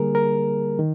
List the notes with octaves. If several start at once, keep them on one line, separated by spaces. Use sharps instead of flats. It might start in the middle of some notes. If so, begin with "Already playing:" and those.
Already playing: D3 G3 A#3 G#4 A#4
A#4
D#3